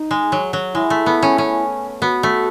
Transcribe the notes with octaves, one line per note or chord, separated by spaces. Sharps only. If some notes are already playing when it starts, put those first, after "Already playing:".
Already playing: D#4
G#3
F#3
F#3
G#3 E4
A3
B3
C#4
C#4
B3 F#4
A3